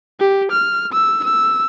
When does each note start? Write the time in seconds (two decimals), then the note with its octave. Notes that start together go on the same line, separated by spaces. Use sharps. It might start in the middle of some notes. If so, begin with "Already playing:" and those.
0.20 G4
0.51 F6
0.92 E6
1.24 E6